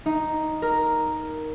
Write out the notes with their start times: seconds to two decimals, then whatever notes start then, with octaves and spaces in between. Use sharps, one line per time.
0.06 D#4
0.62 A#4